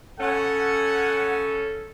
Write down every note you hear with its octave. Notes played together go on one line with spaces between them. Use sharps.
C#3 C#4 A4 F#5